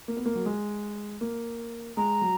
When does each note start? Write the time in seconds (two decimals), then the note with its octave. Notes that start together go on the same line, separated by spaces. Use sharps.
0.08 A#3
0.17 B3
0.26 A#3
0.35 F#3
0.46 G#3
1.21 A#3
1.97 G#3 A#5
2.22 F#3